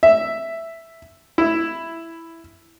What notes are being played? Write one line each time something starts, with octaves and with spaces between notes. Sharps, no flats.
E5
E4